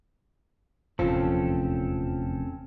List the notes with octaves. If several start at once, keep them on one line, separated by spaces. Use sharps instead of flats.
F1 E2 A#2 F3 C4 C#4 A4